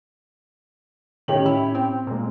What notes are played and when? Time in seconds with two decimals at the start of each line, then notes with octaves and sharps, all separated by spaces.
1.28 A2 D#3 C#4 G4 C#5 F#7
1.46 E4
1.75 C4
2.07 A#2 G#3 A#3 C4